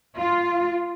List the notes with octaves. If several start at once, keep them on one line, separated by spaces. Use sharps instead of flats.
F4